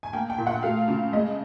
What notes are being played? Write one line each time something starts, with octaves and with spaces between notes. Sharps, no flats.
G#5
A#3 G5
G5
A#2
F#5
A3 F5
C#3
G#3 D#5